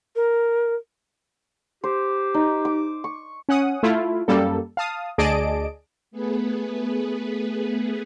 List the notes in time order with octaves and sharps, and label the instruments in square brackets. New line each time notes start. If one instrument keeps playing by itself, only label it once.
[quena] A#4
[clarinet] G4 [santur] C5
[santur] D#4
D6
C#6
[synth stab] C#4 F#5 D#6
A3 E4 F4
F#2 G3 A#3 A4
F5 A5 D#6
D2 G#4 D5 D#5 A5 D7
[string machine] A3 B3 G#4 B4